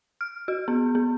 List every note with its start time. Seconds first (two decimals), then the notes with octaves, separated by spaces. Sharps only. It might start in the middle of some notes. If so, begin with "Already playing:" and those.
0.21 F6
0.48 F#4
0.68 B3
0.95 B3